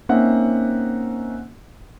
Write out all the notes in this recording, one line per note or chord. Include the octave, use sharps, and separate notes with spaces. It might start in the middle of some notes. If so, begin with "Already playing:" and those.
A#3 C4 C#4 D#4 E5 F#5